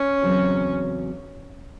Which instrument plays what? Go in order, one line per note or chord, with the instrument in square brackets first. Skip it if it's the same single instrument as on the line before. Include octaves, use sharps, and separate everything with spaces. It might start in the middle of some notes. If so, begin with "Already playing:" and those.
Already playing: [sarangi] C#4
[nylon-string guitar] E2 C#3 F#3 C4